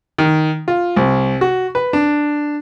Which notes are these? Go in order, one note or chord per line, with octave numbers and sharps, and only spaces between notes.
D#3
F4
C2
F#4
B4
D4